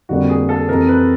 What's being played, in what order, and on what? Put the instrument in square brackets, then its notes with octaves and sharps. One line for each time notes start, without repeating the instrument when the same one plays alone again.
[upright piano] F2 D3 G3 A#3 [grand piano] F#4
[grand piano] G#4
A4
[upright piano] F2 C3 E3 [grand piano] A#4
[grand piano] B4